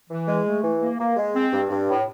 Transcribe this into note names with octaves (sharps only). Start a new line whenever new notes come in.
E3
G#3
A3
E3
A#3
A#3
G#3
C4
G2
G2
A2